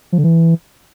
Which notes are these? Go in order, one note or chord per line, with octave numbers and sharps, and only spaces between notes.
F3
D3
E3